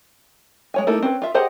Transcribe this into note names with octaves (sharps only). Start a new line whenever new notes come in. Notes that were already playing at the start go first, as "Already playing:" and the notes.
G#3 C#5 G#5
A3 A#3 D#4 E4 A4
C4 C#4 B4
F4 E5
G4 G#4 C5 D#5 F#5